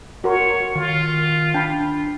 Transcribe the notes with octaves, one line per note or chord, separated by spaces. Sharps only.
F#4 A#4 C#5 C6
D#3 F4
D4 G5 A5 B5